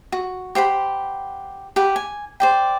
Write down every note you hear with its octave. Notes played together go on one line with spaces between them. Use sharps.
F#4
G4 C5 F#5 B5
G4 B4 F#5
G#5
C5 D5 G5